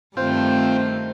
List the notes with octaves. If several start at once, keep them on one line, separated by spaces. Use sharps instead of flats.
G2 D#3 A3 C4 F4 C5 G6